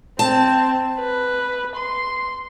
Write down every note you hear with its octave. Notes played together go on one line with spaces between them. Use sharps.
C4 A5
B4
C6